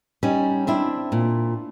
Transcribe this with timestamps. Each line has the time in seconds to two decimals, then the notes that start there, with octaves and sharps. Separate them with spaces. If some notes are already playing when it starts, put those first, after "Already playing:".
0.23 G3 C#4 D#4
0.67 C4 D4 E4
1.12 A#2